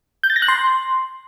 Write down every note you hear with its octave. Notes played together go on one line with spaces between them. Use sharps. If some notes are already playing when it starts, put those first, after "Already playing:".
G6
A6
A#6
F#6
C6